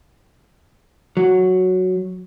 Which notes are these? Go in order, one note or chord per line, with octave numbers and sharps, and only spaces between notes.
F#3